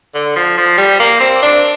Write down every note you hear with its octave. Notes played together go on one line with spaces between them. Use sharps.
D3
F3
F3
G3
A#3
C4
D4